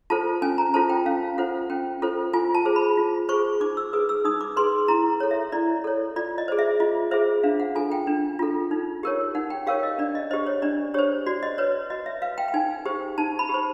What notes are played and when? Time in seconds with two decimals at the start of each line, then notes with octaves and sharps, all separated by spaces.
0.10 F4 A4 C5 A5
0.42 C#4 G#5
0.58 A#5
0.74 F4 A4 C5 A5
0.89 G5
1.06 C#4 F5
1.38 F4 A4 C5 F#5
1.70 C#4 G5
2.02 F4 A4 C5
2.33 F4 G#5
2.55 A5
2.65 G#4 C5
2.76 B5
2.97 F4
3.29 G#4 C5 C#6
3.61 D#4 D6
3.77 E6
3.93 G#4 B4 D#6
4.09 E6
4.25 D#4 D#6
4.41 D6
4.56 G#4 B4 C6
4.88 E4 A#5
5.20 A4 C#5
5.31 E5
5.52 E4 D5
5.84 A4 C#5
6.16 F4 D5
6.38 D#5
6.48 G#4 C5
6.59 E5
6.80 F4 D#5
7.11 G#4 C5 E5
7.43 D4 F5
7.60 F#5
7.75 F4 A4 G#5
7.92 G5
8.07 D4
8.39 F4 A4
8.71 D#4
9.03 G4 A#4 C#5
9.35 D#4 F#5
9.50 G5
9.66 G4 A#4 C#5 F5
9.83 D#5
9.98 D4 D5
10.15 D#5
10.31 C5 D#5
10.34 G4
10.47 C#5
10.62 D4 D5
10.94 G4 C5 C#5
11.26 F#4 D5
11.43 D#5
11.58 B4 C#5
11.90 F#4 D#5
12.06 E5
12.22 B4 F5
12.38 G5
12.48 G5
12.54 D#4 G#5
12.86 G4 C5
13.18 D#4 A5
13.39 B5
13.49 G4
13.54 C5